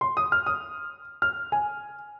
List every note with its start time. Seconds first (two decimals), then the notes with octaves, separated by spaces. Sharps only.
0.01 C6
0.17 D#6
0.32 F6
0.46 D#6
1.22 F6
1.52 G#5